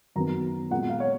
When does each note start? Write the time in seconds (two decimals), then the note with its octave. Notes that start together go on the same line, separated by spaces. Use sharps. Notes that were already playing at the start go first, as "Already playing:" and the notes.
0.16 F#2 D#3 F#3 B3 A#5
0.71 A#2 G#3 B3 F#5
0.90 F5
1.00 C#5